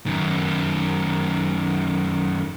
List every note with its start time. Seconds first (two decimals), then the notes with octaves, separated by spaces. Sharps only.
0.06 F#2 D#3